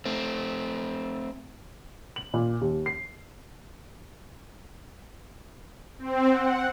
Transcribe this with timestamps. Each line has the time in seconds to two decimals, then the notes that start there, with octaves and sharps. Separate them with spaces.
0.05 A3 C4
2.16 F#7
2.34 A#2
2.61 D#2
2.86 C7
5.99 C4
6.29 F#5